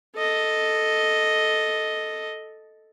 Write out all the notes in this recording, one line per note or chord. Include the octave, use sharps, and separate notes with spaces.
A4 D#5